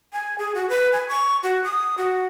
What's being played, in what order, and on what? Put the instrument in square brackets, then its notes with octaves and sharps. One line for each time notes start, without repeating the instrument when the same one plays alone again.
[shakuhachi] G#5
G#4
F#4
B4
G#5
C#6
F#4
D#6
F#4